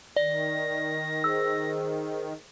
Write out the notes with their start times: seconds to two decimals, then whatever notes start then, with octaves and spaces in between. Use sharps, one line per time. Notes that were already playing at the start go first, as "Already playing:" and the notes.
0.16 D#3 D5 A#6
1.24 G#4 C5 E6